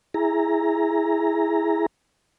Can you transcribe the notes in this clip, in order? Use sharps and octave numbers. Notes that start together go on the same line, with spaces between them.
E4 G#4 A#5